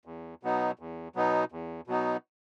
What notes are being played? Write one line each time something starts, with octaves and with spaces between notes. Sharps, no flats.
E2
B2 F#3 B3 D#4
E2
B2 F#3 B3 D#4
E2
B2 F#3 B3 D#4